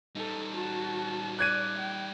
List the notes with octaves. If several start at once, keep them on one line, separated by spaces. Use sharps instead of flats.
G3 D#4 A4
F#4 A5
D5 F#6 G#6 D#7
G5